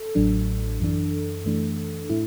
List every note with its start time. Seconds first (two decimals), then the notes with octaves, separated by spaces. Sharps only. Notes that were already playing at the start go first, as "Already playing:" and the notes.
Already playing: A4
0.15 A1 A2 F#3 D4
0.80 F#2 E3 D4
1.45 F#2 E3 A3 D4
2.10 A2 A3 E4